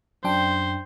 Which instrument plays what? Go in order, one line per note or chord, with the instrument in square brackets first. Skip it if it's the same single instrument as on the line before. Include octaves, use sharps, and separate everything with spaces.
[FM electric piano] F#2 D4 G5 [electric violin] C5